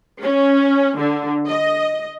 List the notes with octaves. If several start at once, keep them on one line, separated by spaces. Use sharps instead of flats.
C#4
D3
D#5